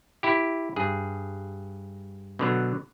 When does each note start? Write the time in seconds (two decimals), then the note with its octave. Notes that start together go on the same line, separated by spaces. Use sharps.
0.23 E4 G4
0.76 G2 G#4
2.39 B2 D3 F#3